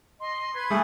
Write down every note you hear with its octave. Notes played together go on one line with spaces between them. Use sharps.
D#5 C6
B4 G#6
G3 A3 G#4